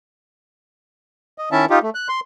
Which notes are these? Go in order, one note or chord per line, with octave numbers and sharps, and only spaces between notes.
D#5
D#3 C#4 E4 E5 A5
D#4 F4 G4
A3
F#6
C6